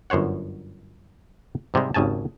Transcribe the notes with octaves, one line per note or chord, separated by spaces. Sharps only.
G1 F#2 C5 C#5 F#5
G#2 C3 G3 G#3
G#1 D#2 C#3 G#5 A5